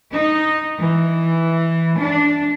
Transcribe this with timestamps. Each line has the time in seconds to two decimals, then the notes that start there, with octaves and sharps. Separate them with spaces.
0.13 D#4
0.82 E3
1.99 D4